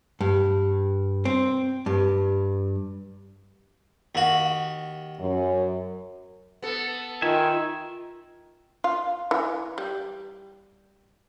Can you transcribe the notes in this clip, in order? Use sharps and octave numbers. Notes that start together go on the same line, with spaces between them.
G2
C4
G2
D#2 F#4
F#2
B3 A4
D#3 F4 E5 G#5
F4
E3
G3